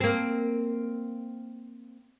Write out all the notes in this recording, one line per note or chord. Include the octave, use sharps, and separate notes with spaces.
A#3 C4